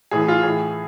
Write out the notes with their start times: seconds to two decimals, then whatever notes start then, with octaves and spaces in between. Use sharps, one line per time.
0.11 A2 E3 G#4
0.28 F4
0.43 A2 E3 G#4